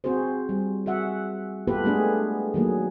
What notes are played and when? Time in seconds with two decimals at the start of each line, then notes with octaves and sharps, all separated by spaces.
0.04 C4 F#4 G#4 C5
0.49 G3
0.86 F#4 G#4 E5 F#5
1.67 B3 F4 G4 A4 B4
1.84 G#3 A3 B3 D4 G#4
2.54 D#3 F#3 A#3 G#4